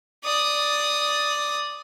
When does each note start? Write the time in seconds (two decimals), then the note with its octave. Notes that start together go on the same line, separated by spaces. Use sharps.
0.25 D5 D#6